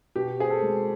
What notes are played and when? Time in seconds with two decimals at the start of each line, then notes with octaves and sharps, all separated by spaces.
0.16 B2 G4
0.39 C4 G#4
0.50 A4
0.62 G#3